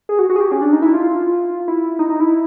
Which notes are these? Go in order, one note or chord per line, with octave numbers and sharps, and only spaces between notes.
G#4
F#4
F#4
G#4
G4
C#4
D4
D#4
E4
F4
E4
D#4
D#4
E4